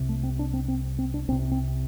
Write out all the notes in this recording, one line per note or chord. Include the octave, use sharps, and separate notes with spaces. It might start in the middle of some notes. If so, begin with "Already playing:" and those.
Already playing: C2 C3
A3
C4
D4
C4
C4
C4
D4
C2 C3 C4
C4